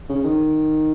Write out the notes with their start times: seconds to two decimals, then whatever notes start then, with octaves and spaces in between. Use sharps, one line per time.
0.09 C#3
0.24 D#3